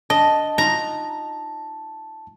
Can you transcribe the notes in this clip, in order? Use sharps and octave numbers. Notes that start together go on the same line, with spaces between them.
D4 D#5 A5
D#4 F4 F#4 A#5